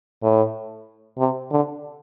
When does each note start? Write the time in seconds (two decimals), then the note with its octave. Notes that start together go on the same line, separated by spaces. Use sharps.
0.23 A2
1.18 C3
1.51 D3